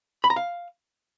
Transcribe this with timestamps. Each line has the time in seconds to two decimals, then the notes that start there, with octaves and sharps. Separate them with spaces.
0.24 B5
0.30 A#5
0.36 F5